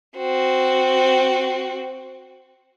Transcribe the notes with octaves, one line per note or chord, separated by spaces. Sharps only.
C4 F#4